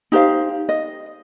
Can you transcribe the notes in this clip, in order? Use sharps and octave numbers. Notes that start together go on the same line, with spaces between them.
D#4 G4 C5 F5
D#5